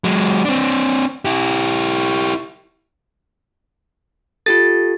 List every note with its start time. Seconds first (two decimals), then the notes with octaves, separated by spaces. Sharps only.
0.04 F#3 G#3
0.45 C4 D4
1.25 E4 G4
4.46 F4 G4 A4 A6